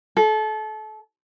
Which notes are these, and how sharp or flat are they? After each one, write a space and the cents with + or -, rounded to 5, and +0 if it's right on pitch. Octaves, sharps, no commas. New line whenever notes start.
A4 -30